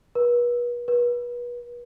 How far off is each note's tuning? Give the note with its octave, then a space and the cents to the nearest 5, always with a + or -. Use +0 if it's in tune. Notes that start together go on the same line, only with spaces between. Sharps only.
B4 -40
B4 -35